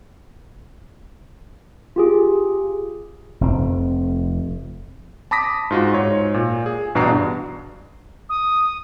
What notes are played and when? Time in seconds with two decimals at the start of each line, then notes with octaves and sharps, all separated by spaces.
1.96 F4 G4 G#4
3.41 F1 F2 C4
5.31 A5 B5 D6 D#6 A#6 B6
5.71 G#2 F4 F#4
5.94 G#2 C#5
6.34 A#2
6.66 G#4
6.95 A1 G2 B2 D4 A#5 C7
8.29 D#6